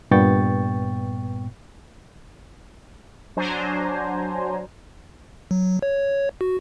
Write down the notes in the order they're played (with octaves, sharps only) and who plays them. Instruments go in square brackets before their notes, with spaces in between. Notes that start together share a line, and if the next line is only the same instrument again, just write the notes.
[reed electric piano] G2 A#2 B3 G5 C#6 A6
[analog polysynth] F#3 D4 C5 G#5 A#5
[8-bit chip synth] F#3
C#5
F#4